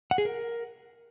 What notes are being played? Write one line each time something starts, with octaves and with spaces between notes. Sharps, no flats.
F#5
G#4
A#4